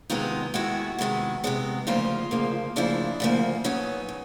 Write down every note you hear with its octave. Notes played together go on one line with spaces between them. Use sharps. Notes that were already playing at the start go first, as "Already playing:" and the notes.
C3 D#3 G#3 B3 D#4 F4
C3 D#3 G#3 B3 E4 F#4
C3 D#3 G#3 B3
C3 D#3 G#3 B3
D2 C#3 F3 A#3 D#4 F4
D2 C#3 F3 A#3
D2 C#3 F3 A#3 D4 E4
D2 C#3 F3 A#3
B2 F#3 B3 C#4 D#4
B2